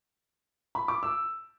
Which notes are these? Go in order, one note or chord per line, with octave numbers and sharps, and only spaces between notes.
B5
D6
E6